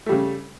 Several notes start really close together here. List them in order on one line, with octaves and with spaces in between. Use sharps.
A3 G3 C#3